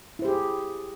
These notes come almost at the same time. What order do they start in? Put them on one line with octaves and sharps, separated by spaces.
E4 C5 G4 G#4